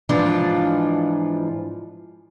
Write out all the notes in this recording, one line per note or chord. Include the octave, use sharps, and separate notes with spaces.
G#2 E3 F3 D4 F4